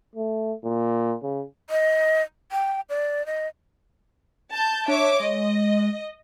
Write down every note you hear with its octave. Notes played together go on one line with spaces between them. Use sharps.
A3
A#2
C#3
D#5
G5
D5
D#5
A5 G6
D4 C#5 E5 D6
G#3 D#5